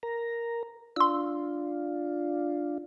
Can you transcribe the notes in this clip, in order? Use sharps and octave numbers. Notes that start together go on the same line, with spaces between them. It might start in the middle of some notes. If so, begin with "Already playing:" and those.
A#4 A#5
D4 F4 C6 E6